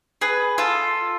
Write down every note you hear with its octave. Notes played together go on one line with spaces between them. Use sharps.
G#4 B4
F4 A4